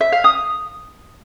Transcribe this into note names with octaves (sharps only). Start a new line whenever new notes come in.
E5
F5
D#6